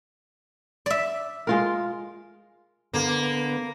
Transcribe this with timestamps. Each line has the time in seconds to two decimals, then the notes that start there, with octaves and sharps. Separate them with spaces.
0.86 D5 E5
1.47 G#3 F4 A#4
2.94 D3 A#3 B3